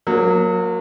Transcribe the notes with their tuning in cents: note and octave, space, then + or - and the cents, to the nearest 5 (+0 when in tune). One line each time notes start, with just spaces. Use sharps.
F#3 -25 A#3 +0